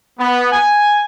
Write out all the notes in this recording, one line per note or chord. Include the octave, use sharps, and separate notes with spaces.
B3
G#5